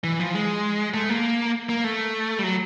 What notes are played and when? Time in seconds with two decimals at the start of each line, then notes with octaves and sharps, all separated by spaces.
0.04 E3
0.20 F3
0.34 G#3
0.94 A3
1.09 A#3
1.69 A#3
1.84 A3
2.39 G3
2.43 F#3